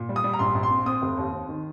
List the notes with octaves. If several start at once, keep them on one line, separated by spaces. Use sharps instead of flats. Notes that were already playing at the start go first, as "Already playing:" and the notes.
Already playing: A#2
G3
D#6
G3
A#5
A#1 C6
A#1
C6
C4
C4 D#6
F1
D#2
C4
D#3